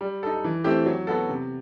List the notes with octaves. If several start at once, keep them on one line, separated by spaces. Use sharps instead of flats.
G3
D#4 A4
E3
A3 C4 E4 G4
F#3
B3 F#4 A4
C3